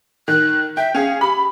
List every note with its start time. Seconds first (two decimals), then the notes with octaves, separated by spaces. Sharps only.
0.28 D#3 F#6
0.77 E5 G5
0.95 C#4 G#4 F5
1.21 G4 B5